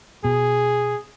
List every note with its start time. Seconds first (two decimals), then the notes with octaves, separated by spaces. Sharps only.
0.24 B2 G#4